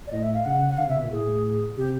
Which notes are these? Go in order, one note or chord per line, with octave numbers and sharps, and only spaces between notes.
D5
A2 D#5
E5
F5
C#3 F#5
F#5
D3 F5
C3
E5
B2
A#2
A2 G#4
C3 G4